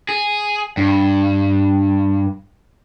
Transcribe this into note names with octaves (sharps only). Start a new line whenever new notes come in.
G#4
G2